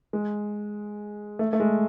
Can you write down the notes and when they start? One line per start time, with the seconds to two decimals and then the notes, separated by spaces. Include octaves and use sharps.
0.13 G#3
1.39 A3
1.53 A3
1.60 G#3